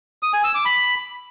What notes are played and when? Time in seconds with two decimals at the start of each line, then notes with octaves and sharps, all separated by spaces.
0.23 D#6
0.33 G#5
0.44 E6
0.55 D6
0.65 B5